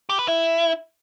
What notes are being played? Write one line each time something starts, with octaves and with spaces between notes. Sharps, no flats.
G4
B4
E4